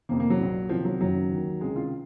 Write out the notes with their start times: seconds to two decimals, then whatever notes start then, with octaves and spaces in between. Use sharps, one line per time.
0.09 F1 F2 C3 D#3 A#3
0.20 A#3
0.30 F#3
0.39 A#1 A#2
0.69 C2 C3 D#3 F3
0.85 F#3
1.00 F#1 F#2 D#3 F#3
1.31 D#2 D#3
1.61 C#2 C3 D#3 G#3
1.76 F4